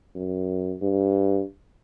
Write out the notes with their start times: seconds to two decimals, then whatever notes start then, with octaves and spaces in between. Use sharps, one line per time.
0.15 F#2
0.81 G2